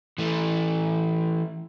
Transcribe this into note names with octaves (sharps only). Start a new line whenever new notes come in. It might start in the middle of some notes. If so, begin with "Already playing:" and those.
E3 A3